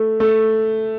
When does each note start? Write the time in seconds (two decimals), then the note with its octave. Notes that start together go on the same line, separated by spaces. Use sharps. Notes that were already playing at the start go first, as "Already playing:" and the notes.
Already playing: A3
0.20 A3